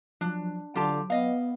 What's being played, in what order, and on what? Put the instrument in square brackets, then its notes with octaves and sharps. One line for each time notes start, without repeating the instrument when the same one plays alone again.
[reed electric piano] F3 F#3 [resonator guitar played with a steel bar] D4
[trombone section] D3 [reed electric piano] F#3 [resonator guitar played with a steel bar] F4 G4 A5
[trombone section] B3 [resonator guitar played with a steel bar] D#5 F5